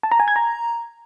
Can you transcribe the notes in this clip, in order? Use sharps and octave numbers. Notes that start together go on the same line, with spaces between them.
A5
A#5
G#5
G#6
A#5